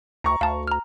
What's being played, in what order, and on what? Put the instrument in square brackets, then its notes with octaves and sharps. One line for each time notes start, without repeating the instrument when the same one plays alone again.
[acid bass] D2 [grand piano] A#5 C#6
[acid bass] D2 [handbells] F5 A5
[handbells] A#5 F6